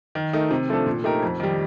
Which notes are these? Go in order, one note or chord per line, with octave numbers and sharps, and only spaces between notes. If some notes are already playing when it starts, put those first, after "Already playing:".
D#3
A3 D#4 A#4
C3
F3 A3 D4 A4
A#2
A3 D#4 G4 A#4
F2
D#3 G3